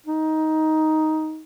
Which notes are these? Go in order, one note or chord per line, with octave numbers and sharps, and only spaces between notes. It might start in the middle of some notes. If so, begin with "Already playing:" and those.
D#4